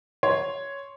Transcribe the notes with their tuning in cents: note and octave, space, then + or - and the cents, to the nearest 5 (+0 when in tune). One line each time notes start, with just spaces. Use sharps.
C#5 +0 C6 +0